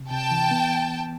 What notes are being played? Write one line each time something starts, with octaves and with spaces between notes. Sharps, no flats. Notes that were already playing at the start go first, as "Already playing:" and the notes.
Already playing: C#2 C3
C3 G5 A5
E3
B3